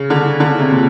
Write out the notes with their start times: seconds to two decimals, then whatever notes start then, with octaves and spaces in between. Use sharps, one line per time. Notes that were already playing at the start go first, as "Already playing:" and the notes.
Already playing: C#3
0.10 D3
0.40 D3
0.60 C3
0.71 A#2